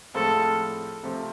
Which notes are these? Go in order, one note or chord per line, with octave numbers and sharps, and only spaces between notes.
A2 F3 G#3 C4 F4 A4
C3 F3 A3 C4